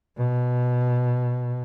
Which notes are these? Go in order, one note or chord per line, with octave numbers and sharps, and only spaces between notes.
B2